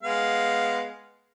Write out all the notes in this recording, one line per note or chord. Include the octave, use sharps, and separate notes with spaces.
G#3 B3 F5